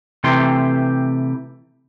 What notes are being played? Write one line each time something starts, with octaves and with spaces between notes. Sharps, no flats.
C3 E3 A3 G4 C6